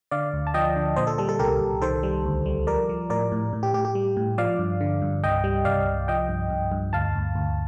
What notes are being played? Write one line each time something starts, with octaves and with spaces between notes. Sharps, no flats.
D3 D5 F5
D2
A5
F3 D#5 G5
D3
A#2 C5 D#5
A4
G3 A4
A4
C2 G4 A#4
C2
D#3 A4 C5
G3
D2
G3
F3 A#4 D5
F3
A2 A#4 D5
A2
A2
G4
A2 G4
G4
G3
A2
F3 D5 F5
G2
D3
G2
C2 D#5 G5
G3
C2 D5 F5
C2
F3 D#5 G5
G2
G2
G2
D2 F5 A5
D2
D2